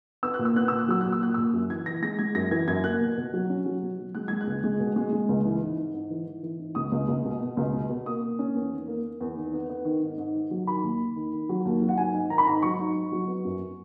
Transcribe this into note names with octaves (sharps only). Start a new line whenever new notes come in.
B3 E6
F#6
A#2
E6
B3 F#6
A#2 E6
F#6
F#3 E6
A#2 F#6
E6
A#2 F#6
A#2 E6
F#2
E3 G#6
E3 A#6
G#3 A#6
G#3 G#6
F#2 A#6
E3 G#6
F#2 G#6
A#3 F#6
B2
B2
F#3
C#4
F#3
B2
F#3
G#3 F#6
G#3 G#6
F#6
C#2
G#3
B2
G#3
G#3
C#2
E3
G#2
G#2
G#2
E3
E3
E3
G#2
C#2 D#6
C#2
C#2
B2
B2
C#2
B2
B2
A#3 D#6
A#3
C#4
E2
D#3
A#3
A#3
E2
D#3
B3
B3
D#3
G#2
G#2
D#3
F#3
D#3 B5
D#2
D#2
D#3
D#3
F#3
D#2
F#3
F#5
G#2 G#5
G#2
D#3 A#5
B5
G#2 A#5
F#3 C#6
G#2
G#2
F#3
B3
F#2